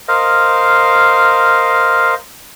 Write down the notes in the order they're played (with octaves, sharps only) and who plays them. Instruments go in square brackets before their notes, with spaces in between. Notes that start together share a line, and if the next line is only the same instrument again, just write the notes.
[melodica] A#4 C5 D#5 F5